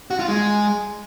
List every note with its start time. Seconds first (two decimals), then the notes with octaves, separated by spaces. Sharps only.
0.11 F#4
0.19 F4
0.28 G#3